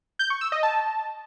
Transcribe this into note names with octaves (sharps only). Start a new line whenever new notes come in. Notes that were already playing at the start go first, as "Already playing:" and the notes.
G6
C#6
E6
D#5
A5